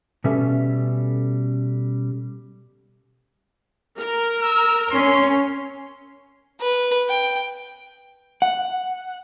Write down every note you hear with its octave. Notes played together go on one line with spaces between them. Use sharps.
B2 G3 C#4 A4 E5
A#4
E6
C#4 C6
B4
G5
F#5